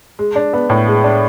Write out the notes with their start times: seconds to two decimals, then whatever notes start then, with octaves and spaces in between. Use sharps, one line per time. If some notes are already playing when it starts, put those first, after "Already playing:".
0.19 G#3
0.36 D4
0.53 B3
0.70 A2
0.87 G#3
1.04 D4